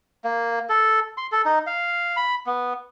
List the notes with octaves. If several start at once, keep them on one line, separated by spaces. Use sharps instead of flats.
A#3
A4
C6
A4
D#4
F5
B5
B3